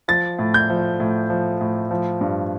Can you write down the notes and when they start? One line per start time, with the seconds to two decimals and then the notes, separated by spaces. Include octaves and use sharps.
0.08 F3 A6
0.39 A2
0.54 G6
0.70 F3
1.00 A2
1.30 F3
1.61 A2
1.91 F3
2.21 G2